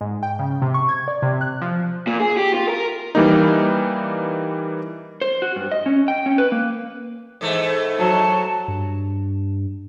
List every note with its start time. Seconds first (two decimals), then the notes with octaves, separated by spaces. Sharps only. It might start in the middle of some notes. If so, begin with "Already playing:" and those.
0.01 G#2
0.23 G5
0.39 C#3
0.62 C3
0.74 C#6
0.89 G#6
1.08 D5
1.22 C3
1.41 F#6
1.61 F3
2.07 A#2
2.20 G#4
2.37 G4
2.55 F4
2.69 A#4
3.15 E3 G3 A#3 D#4
5.21 C5
5.42 F#4
5.56 G2
5.72 D#5
5.86 C#4
6.08 G5
6.26 C#4
6.38 B4
6.52 A#3
7.41 G#2 E3 A3
7.98 F#3 A5
8.68 G2